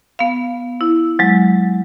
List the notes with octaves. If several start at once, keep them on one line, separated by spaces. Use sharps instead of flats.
B3 F5
E4
F#3 G#3